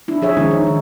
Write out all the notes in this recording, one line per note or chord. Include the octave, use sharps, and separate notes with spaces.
D4 E4
F3 G#4 C#5 E5
D#3 G#3 C#4 D#4
D#4
D#3